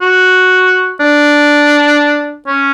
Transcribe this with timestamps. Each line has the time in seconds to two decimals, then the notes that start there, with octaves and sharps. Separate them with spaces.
0.01 F#4
1.00 D4
2.48 C#4